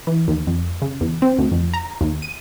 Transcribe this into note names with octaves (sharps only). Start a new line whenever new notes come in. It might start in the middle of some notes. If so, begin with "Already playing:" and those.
E3
D#2
F2
C#3
E2
C4
D2
F2
A#5
D#2
D#7